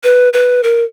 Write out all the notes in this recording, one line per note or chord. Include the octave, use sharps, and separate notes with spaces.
B4
B4
A#4